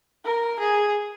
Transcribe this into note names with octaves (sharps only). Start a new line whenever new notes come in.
A#4
G#4